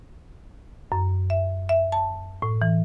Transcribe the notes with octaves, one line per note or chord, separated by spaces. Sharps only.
F#2
E5
E5
A5
A2
E3